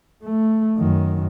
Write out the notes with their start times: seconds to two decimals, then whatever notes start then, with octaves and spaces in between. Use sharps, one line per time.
0.23 A3
0.78 F#2 D#3